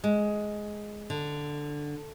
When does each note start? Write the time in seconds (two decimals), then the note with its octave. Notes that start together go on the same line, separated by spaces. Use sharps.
0.04 G#3
1.10 D3